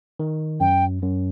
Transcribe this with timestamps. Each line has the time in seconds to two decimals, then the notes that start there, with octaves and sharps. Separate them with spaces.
0.20 D#3
0.60 F#2 G5
1.02 F#2